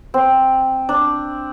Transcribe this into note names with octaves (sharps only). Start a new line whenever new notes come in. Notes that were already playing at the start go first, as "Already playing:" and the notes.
C4
D4